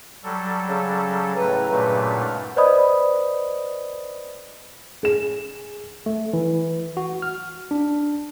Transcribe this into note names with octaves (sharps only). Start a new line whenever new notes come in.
F#3 G3 A4
C#3
A2 B4 A#5
G2 A#2 F#3 A3 B4
G#2 F5 F#5
B4 C5 D5 D#5 B5 D#6
G#4 E7
A3
E3
F#4
F6
D4